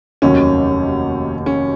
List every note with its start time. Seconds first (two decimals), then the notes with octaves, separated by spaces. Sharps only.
0.22 F1 D#2 D#3 F#3 C#4
1.46 C#4